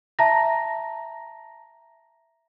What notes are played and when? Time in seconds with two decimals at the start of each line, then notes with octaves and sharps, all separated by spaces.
0.19 E5 A5 A#5 A#6